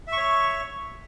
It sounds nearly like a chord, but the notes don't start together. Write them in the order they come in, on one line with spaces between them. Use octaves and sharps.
E5 C#6 C#5